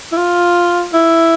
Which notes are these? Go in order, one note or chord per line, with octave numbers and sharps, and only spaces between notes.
E4
F4
E4